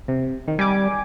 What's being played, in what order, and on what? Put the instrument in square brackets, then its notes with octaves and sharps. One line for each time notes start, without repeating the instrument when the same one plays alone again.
[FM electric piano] C3
D#3
[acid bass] G3 [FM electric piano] G#5 D6